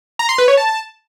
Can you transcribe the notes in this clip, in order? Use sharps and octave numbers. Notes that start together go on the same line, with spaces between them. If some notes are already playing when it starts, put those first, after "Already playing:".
A#5
C6
B4
C#5
A5